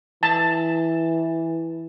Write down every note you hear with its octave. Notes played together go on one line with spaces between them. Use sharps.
E3 A5